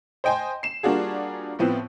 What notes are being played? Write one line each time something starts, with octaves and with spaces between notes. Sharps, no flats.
C5 D#5 G5 G#5 C6
C7 E7
G3 A#3 D4 F4 F#4 G#4
A2 F3 B3 C4